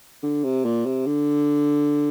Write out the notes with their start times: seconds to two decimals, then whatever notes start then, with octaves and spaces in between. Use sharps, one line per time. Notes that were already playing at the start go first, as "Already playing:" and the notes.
0.23 D3
0.44 C3
0.65 A#2
0.86 C3
1.06 D3